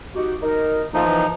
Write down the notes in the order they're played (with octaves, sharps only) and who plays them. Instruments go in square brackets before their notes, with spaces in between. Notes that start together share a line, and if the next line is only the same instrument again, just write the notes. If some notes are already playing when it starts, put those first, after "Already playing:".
[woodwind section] D#4 F#4 G4
D#4 A#4
[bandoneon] F3 D#4 [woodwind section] A3 A#3 F4
[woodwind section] E3